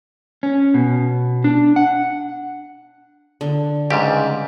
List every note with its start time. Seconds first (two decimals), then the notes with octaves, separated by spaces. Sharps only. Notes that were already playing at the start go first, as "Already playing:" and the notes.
0.43 C#4
0.74 B2
1.44 D4
1.76 F#5
3.41 D3
3.91 C#2 G#2 G3 G4